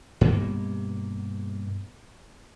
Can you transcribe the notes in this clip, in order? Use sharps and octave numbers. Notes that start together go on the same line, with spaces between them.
G2 B2 A#3